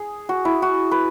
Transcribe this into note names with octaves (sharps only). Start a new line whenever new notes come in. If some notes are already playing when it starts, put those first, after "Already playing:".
Already playing: G#4
F#4
E4
F#4
B4